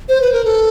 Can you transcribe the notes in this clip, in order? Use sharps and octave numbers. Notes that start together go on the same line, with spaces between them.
C5
B4
A#4
A4